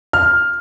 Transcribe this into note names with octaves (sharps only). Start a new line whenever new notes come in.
F6